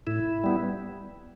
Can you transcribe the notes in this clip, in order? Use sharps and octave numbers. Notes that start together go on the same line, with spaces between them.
A2 E4
G3 B3